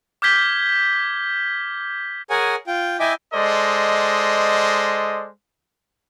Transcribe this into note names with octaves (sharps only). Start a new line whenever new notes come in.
D6 F6 G6 G#6 B6 G7
G#4 A#4 C#5 F#5 G#5
F4 G5
E4 D#5 E5 G5 G#5 D6
G#3 A4 C5 D5 D#5